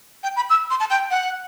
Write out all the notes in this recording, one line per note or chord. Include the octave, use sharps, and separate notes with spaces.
G5
B5
E6
C6
A5
G5
F#5